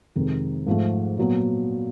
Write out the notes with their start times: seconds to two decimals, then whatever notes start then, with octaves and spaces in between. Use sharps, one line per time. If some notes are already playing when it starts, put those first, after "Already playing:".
0.16 F2 C3 D#3 G#3
0.67 G#2 F3 A3
1.17 A#2 F#3 B3